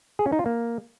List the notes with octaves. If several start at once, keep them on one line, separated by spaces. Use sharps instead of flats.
G#4
C#4
D#4
F4
A#3